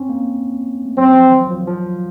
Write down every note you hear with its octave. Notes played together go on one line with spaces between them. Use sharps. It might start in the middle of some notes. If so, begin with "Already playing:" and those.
Already playing: C4 C#4
A#3
A3
F#3 C4
F3
D#3
F#3
F3
D#3
F3